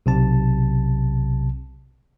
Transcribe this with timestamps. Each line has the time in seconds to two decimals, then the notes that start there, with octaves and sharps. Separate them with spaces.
0.06 B1 C3 A5